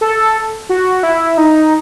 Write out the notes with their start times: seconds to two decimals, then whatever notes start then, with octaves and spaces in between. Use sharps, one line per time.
0.01 A4
0.69 F#4
1.03 E4
1.38 D#4